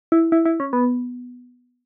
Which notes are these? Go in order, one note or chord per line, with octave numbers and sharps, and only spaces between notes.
E4
E4
E4
C#4
B3